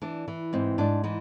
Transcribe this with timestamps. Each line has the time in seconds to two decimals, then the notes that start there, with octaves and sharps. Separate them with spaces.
0.02 E3 D4
0.28 E3
0.53 G#2 C4
0.78 G#2 D4
1.04 E3 D#4